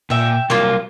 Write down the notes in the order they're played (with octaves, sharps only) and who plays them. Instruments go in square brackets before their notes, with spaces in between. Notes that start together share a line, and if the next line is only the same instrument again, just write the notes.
[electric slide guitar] A#2 [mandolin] E5 G5
[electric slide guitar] C3 F#3 G3 [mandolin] A#3 F4